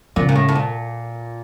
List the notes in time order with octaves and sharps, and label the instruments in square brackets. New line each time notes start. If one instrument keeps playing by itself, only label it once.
[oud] A#2 [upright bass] C#3
[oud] A#2
A2
A2
A#2